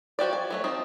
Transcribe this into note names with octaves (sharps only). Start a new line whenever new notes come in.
F3 F#4 G4 D5
G#5
F#3 A3 C#5
F3 C4 D#4